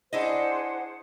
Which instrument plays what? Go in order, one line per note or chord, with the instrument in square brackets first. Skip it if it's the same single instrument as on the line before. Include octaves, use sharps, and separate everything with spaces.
[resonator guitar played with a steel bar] D4 E4 D#5 [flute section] G#4 C5 F#5